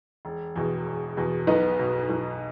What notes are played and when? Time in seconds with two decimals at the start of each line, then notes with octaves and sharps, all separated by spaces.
0.25 E1
0.56 E2 B2
0.86 E1
1.17 E2 B2
1.47 B1 B3 D#4
1.79 B2
2.10 B1